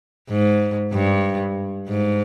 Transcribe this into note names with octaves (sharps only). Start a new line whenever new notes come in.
G#2
G2
G#2